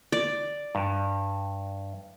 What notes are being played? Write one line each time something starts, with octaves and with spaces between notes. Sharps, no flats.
D5
G2